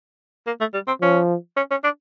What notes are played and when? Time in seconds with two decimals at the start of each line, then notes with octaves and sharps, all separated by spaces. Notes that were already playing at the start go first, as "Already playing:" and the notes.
0.47 A#3
0.60 A3
0.74 G3
0.88 C4
1.02 F3 C#4
1.57 C#4
1.71 C#4
1.84 D4